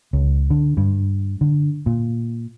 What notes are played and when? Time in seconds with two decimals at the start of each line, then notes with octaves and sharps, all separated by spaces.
0.13 C#2
0.51 D3
0.77 G2
1.41 D3
1.86 A#2